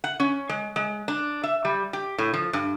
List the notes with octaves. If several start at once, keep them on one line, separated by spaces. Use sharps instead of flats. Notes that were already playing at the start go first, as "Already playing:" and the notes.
F#5
C#4
G#3
G#3
D4
E5
G3
G4
A2
F3
G2